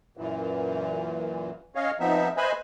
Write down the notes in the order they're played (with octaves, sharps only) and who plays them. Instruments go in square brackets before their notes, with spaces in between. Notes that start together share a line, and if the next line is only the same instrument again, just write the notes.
[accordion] F#2 A#2 E3
C#4 C#5 D#5 F5
F3 B3 C4 D#4 E5
B4 C5 D#5 E5 G#5 B5